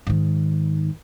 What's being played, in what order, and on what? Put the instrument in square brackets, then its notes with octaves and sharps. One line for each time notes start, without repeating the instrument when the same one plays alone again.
[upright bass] G#2 D#3